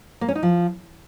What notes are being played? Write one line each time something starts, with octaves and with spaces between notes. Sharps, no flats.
A#3
C#4
D#4
F3